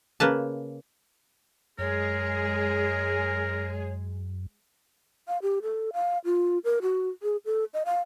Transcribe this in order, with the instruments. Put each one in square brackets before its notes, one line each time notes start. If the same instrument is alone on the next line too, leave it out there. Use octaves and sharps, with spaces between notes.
[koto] C#3 A#3 B4 A5
[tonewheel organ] F#2 [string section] G#3 G#4 [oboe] A#4 [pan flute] C#5
[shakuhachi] F5
G4
A4
F5
F4
A#4
F#4
G#4
A4
D#5
F5